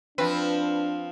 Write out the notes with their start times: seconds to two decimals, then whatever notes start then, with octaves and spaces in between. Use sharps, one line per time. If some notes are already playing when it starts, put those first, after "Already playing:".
0.18 F3 C4 D4 B4